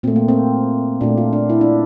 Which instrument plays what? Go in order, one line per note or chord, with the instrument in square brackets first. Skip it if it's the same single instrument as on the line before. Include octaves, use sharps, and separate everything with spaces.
[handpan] A#2 A3 C4
A#3
C4
A#2 A3 D4
F4
D4
E4
D4